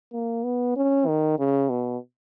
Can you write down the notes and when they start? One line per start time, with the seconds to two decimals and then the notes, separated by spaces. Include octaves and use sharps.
0.13 A#3
0.44 B3
0.76 C#4
1.07 D#3
1.39 C#3
1.70 B2